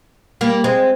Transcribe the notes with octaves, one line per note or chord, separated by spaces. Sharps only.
G3 A#3
G#3 C4